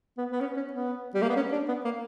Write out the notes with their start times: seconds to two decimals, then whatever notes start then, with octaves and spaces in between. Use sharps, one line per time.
0.17 B3
0.31 B3
0.41 C#4
0.56 C#4
0.73 B3
1.14 G3
1.22 A#3
1.29 B3
1.36 C#4
1.52 D4
1.68 B3
1.85 A#3